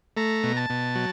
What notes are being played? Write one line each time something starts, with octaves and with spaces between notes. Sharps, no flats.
A3 A#5
B2
A5
B2
F#3